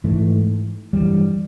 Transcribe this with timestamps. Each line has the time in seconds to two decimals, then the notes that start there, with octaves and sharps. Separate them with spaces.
0.04 G#2 E3 A3
0.93 G2 E3 G3